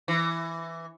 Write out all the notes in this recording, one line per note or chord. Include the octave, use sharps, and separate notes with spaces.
E3